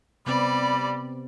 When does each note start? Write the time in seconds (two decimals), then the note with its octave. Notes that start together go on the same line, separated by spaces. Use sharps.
0.26 C3 G3 B3 C4 D5 B5